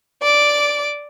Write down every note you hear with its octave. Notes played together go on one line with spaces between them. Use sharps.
D5 D6